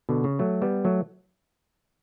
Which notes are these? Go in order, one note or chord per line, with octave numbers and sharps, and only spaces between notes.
B2 D3
C#3
F#3 A3
G3 B3
F#3 A3